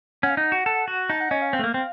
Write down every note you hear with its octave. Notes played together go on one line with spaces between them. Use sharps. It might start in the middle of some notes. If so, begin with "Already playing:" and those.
C#4 F#5
F5
D#4 F#5
F#4
A4
F#4
D#4 A5
F#5
C#4 D#5
F5
C4 F5
A3
A#3
C4